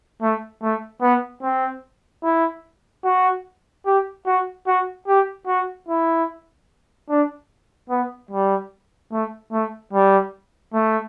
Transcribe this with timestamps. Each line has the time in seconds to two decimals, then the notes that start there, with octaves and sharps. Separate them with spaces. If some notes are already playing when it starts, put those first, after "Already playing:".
0.22 A3
0.62 A3
1.02 B3
1.43 C4
2.23 E4
3.04 F#4
3.86 G4
4.26 F#4
4.67 F#4
5.08 G4
5.48 F#4
5.89 E4
7.09 D4
7.90 B3
8.31 G3
9.12 A3
9.53 A3
9.93 G3
10.74 A3